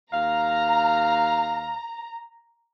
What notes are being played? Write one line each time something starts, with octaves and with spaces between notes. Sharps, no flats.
D#2 F5 A#5